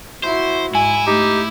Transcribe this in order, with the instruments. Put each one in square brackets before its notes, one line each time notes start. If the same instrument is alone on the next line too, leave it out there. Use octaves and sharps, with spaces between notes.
[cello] E4 F#4 [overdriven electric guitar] C5
[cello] G#2 [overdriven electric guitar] E4 [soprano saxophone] G#5
[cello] A3 [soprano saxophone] D#4 [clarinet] G4